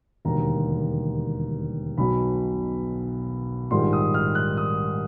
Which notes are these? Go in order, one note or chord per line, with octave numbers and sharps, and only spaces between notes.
E1 D#2 D3 G3 A#5
B1 B2 F#3 B5
A#1 G#2 D#3 G3 C6
D#6
F6
F#6
D#6